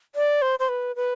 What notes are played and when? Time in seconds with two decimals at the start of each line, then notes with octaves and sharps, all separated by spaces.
0.15 D5
0.42 C5
0.59 C5
0.69 B4
0.96 B4